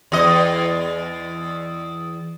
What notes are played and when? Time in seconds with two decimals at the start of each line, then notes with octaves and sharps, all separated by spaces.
0.12 E2 D#5